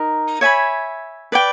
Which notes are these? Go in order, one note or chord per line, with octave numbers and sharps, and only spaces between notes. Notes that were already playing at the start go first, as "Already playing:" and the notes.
Already playing: D#4 A#4
C#5 E5 G#5 B5
B4 D5 G5